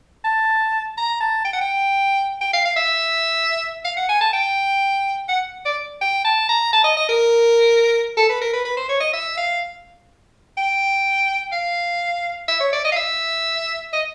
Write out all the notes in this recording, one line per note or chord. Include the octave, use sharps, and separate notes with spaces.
A5
A#5
A5
G5
F#5
G5
G5
F5
F5
E5
F5
F#5
G#5
A5
G5
F#5
D5
G5
A5
A#5
A5
D#5
D#5
A#4
A4
B4
A#4
B4
B4
C5
C#5
D#5
E5
F5
G5
F5
E5
C#5
D5
D#5
F5
E5
D#5